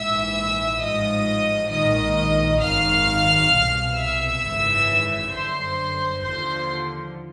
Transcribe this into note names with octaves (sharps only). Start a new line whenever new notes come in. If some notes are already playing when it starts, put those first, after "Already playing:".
Already playing: A#1 G#2 E3 E5 E6
A1 G#2 F3 D#5 D#6
A#1 G#2 D#3 D#5 D#6
G#1 F#2 D#3 F5 F6
C2 B2
E5 E6
G#1 F#2 C#3 E3
G1 F#2 D3 C5 C6
D#2 D3 F3 C5 C6